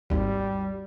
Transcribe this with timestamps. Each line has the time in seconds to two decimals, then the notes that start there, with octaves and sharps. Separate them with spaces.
0.10 G#1 D#2 G3